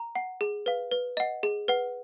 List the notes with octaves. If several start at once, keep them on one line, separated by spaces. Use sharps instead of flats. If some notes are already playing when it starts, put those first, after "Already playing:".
Already playing: A#5
F#5
G#4
B4 F5
B4
D#5 F#5
G#4
B4 F#5